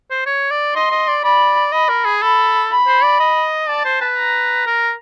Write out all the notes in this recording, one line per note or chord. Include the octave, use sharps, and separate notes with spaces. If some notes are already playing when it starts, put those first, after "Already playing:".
C5
C#5
D5
D#5 C6
D#5
D5
D5 B5
D#5 B5
A#4
G#4
A4 B5
B5
C5
D5
D#5
D5 A5
C5
B4
A#5
A#4